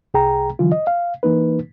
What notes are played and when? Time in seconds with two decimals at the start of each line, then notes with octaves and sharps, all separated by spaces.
0.14 C2 G#4 G5 A#5
0.59 D3 E3 F#3 F4
0.72 D#5
0.87 F5
1.23 E3 A#3 D#4 B4